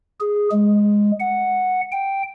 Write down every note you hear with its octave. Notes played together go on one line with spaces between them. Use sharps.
G#4
G#3
F#5
G5